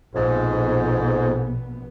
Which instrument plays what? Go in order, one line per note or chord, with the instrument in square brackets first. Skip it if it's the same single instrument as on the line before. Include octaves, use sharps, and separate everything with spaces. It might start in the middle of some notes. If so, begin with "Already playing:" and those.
[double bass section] A#1 B2 B3 [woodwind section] F2 G#2